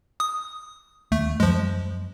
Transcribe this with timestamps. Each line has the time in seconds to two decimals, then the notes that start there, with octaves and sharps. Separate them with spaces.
0.20 D#6
1.12 D#2 A3
1.40 F#2 F3 G#3